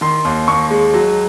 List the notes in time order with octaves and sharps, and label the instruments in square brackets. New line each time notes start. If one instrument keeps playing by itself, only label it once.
[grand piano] D#3 C6
D#2
D#2 C#6
G#3
F#3